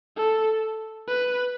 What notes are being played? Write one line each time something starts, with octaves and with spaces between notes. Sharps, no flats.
A4
B4